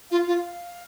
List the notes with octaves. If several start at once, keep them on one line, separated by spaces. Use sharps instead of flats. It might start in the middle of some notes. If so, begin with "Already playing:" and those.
F4 F5
F4